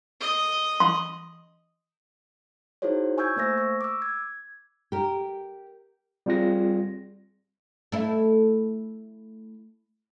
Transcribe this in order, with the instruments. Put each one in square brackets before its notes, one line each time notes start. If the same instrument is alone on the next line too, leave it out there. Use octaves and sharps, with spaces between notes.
[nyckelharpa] D#5
[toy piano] C6
[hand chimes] D#4 E4 F#4 G#4 C5 C#5
G#5 C#6 E6 G6 G#6
A3 A#3 C5 E6 A#6
C#6
D6 E6
G#6
[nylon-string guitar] G4 A#4
[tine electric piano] G3 C4 F4 G#4 A#6
[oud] A3 E4